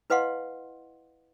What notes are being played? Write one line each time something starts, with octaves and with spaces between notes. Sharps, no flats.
E4 B4 D#5 F5 F#5 C6